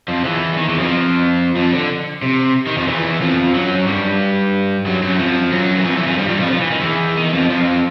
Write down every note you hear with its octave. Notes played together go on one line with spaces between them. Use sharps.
F2 F3
E2 E3
E3
D#3
E2 E3
F2 F3
F2 F3
D3
C3
D#3
F2 F3
E2 E3
F2 F3
F#2 F#3
G2 G3
F#2 F#3
F#2 F#3
F2 F3
F#2 F#3
E3
F2 F3
E2 E3
F2 F3
G2 G3
G2 G3
F2 F3
F3
E3
D#3
E2 E3
D#3
F2 F3
F2 F3